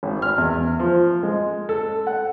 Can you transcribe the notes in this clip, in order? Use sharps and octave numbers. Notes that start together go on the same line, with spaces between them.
G#1
F6
E2
F3
G#3
A4
F#5